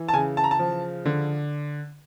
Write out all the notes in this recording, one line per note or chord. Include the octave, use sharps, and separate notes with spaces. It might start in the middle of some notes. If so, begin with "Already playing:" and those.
Already playing: E3
A5
C#3 G#5
A5
A#5
A5
F3
D3